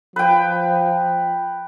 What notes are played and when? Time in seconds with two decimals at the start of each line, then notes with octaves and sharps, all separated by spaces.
0.16 F3 B4 G5